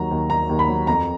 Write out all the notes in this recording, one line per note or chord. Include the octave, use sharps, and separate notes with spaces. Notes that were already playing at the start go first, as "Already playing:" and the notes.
Already playing: D#2 F#3 A#5
D#2
D#2 A#5
D#2
B5
F#3
F2 A#5